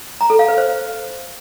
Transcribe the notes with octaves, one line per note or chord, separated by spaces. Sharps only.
A#5
A4
F5
B4
C5